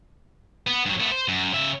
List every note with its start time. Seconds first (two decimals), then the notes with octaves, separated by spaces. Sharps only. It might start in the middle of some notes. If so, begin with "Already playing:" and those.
0.67 B3
0.86 G2 F#3
1.00 A3 B3
1.12 C5
1.28 F#2
1.54 C#3 E5